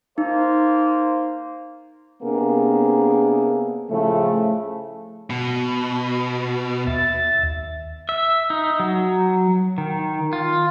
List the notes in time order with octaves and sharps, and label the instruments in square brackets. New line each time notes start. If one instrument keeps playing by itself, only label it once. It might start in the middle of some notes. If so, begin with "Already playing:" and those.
[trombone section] A#3 C5 [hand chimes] D#4
[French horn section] C3 A#3 B3 D4 G#4 A#4
A2 C#3 F3 A3
[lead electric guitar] B2
[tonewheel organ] D#2 E5 A6
[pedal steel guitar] E5
D#4
F#3
D#3
F4